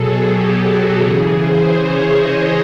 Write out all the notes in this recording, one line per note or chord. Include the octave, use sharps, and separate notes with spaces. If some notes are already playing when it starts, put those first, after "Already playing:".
Already playing: B2 F#3 G#4 A4
G4
F#4
C#3 E3 G#4
C5
C#5
D#5